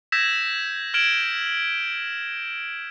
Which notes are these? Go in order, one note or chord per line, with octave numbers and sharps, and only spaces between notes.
E6 G6 G#6 A#6 B6 E7
F6 G#6 D7 E7 F#7